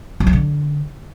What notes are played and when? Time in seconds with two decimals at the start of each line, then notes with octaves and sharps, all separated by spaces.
0.20 F#3
0.27 C#4
0.33 D3